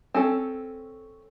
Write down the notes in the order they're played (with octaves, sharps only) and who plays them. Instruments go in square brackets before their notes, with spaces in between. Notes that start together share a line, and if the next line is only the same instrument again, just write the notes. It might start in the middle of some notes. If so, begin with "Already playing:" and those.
[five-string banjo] C4 C#4 A4